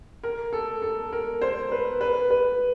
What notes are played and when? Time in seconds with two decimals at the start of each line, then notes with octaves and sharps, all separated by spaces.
0.23 A#4
0.53 A4
0.82 A4
1.12 A#4
1.42 C5
1.72 B4
2.01 B4
2.30 B4